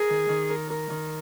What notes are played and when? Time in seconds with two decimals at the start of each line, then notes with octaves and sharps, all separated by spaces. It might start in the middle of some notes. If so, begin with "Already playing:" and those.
Already playing: G#4 A#4
0.10 D#3
0.29 D#3
0.50 A#4
0.70 A#4
0.90 D#3